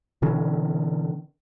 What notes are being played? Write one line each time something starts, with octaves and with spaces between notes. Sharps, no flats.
B2 D3 E3 C#4